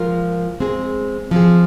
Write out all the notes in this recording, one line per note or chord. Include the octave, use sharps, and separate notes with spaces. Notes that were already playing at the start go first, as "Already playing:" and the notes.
Already playing: F3 G#3 F4 A#4
G#3 C4 G#4
F3 C4 G#4